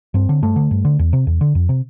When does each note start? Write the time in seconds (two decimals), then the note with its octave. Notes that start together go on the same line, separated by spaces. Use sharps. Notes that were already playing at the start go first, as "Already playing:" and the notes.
0.14 G2 C4
0.29 D3
0.42 G2 A3
0.56 D3
0.71 G2
0.85 D3
0.99 E2
1.13 C3
1.27 E2
1.41 D3
1.55 F2
1.69 C3